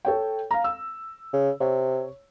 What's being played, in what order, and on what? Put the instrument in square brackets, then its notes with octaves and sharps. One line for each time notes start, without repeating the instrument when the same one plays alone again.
[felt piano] A4 C#5 G5
F5 A#5
E6
[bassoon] C#3
[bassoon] C3 [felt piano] C#5